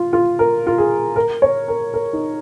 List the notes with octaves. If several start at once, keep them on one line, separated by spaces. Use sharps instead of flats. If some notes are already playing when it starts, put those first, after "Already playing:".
Already playing: F4
F4
A#4
F4
G#4
A#4
C#5
A#4
A#4
D#4